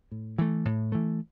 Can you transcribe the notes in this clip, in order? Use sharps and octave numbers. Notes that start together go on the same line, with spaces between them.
A2
E3 A3
A2
E3 A3